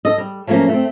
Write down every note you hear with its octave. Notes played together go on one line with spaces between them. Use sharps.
A4 D#5
G3
F3 F#3 A3 A#3 C#4
A3 C4